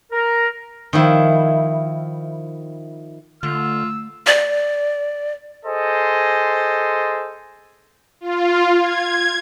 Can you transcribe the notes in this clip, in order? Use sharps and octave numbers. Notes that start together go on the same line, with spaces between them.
A#4
D#3 F3 E4
D3 A3 F4 E6
D5
G#4 A4 C5 D#5
F4
G#6